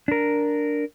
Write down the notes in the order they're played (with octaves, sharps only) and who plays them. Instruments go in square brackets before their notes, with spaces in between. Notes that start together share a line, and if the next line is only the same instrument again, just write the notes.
[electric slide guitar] D4 A#4